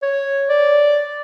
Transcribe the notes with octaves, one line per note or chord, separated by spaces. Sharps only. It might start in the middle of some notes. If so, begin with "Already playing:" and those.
C#5
D5